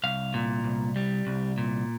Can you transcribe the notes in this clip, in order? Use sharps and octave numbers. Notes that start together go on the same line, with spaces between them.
C2 F5
A#2
C2
G3
C2
A#2